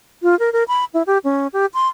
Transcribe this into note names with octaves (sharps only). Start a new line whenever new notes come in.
F4
A#4
A#4
B5
E4
G4
C#4
G4
C6